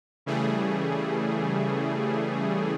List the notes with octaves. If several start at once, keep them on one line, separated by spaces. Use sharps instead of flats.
C#3 E3 G3 A3 G#4